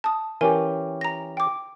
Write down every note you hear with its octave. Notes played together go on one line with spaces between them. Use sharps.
A5 D#6
E3 C#4 G4 A#4 G#5
A#5 A#6
G5 D6